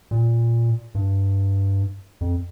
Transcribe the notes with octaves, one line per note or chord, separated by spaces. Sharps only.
A#2
G2
F2